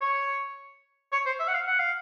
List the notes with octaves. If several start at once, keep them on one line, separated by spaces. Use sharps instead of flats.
C#5
C#5
C5
E5
F#5
F5
F#5
F5